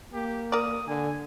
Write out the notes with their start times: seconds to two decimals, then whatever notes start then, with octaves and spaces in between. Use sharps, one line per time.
0.13 A#3 G4
0.52 A#4 D5 D#6
0.87 D3 G#5